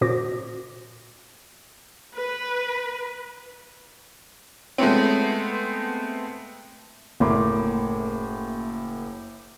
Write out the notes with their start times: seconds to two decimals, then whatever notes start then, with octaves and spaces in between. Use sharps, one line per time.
0.01 A#2 C#4 F#4 C5 D6 A#6
2.14 B4
4.78 G#3 A3 B3 C4
7.20 F#1 A2 A#3 B5 C6 D6